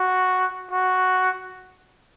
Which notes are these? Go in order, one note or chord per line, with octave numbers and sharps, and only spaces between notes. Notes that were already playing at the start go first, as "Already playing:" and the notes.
Already playing: F#4
F#4